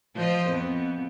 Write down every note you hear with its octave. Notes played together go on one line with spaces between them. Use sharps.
F3 C5 D#5
F2 B3